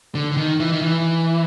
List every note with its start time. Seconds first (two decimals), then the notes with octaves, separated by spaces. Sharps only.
0.15 D3
0.31 D3
0.37 D#3
0.60 E3
0.72 D#3
0.82 E3